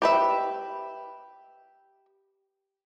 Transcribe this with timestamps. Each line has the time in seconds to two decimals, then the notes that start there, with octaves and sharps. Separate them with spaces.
0.02 G4 B4 E5